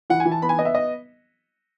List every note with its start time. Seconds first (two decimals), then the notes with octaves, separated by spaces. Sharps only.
0.10 E3 F#5
0.20 G#5
0.25 E3
0.32 A5
0.42 B3 B5
0.49 G#5
0.58 B3 D#5
0.65 E5
0.75 D#5